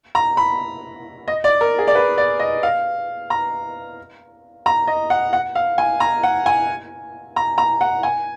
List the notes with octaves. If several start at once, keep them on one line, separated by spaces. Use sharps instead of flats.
A#5
B5
D#5
D5
A#4
G#4
D5
B4
D5
D#5
F5
A#5
A#5
D#5
F#5
F#5
F5
G#5
A#5
F#5
G#5
A#5
A#5
F#5
G#5